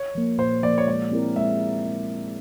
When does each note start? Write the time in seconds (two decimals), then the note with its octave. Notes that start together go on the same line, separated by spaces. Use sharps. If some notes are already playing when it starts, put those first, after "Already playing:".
Already playing: C#5
0.15 F3 A#3
0.38 A#2 C5
0.63 F3 A#3 D5
0.78 C#5
0.87 G#3 D5
1.12 C4 E4 G4 A#4
1.36 G#3 E5